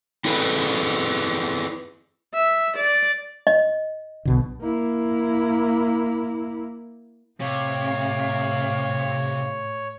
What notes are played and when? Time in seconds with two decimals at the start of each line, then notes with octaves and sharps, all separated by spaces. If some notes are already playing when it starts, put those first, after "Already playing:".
0.25 C4 E4 G#4 A4 B4
2.34 E5
2.76 D5
3.47 D#5
4.25 B1 B2 D3
4.61 A#3 E4
7.40 A2 C3 C#5 F5